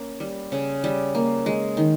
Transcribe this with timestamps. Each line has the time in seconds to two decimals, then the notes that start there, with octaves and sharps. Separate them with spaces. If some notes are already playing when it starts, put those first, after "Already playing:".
Already playing: A#3 C#4
0.20 G3
0.52 C#3
0.84 G3
1.15 A#3
1.46 G#3
1.77 D#3